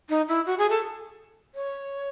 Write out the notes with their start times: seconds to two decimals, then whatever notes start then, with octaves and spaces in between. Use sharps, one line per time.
0.09 D#4
0.29 E4
0.46 F#4
0.58 G#4
0.70 A4
1.55 C#5